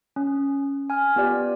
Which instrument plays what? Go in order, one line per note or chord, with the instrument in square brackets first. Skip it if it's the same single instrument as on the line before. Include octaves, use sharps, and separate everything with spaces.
[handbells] C#4
G#5 F6
B3 F4 G4 D5